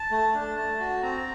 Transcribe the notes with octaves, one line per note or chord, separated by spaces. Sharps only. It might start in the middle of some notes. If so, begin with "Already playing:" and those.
Already playing: A5
A3
D4
A3
F#4
C4 A#5